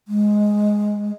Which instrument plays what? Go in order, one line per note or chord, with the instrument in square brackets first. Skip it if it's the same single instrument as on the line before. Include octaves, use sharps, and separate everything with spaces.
[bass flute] G#3